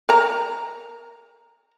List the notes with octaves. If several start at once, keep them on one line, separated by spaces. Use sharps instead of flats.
A#4 A#5